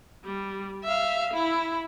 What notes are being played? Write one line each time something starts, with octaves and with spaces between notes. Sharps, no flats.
G3
E5 F5
E4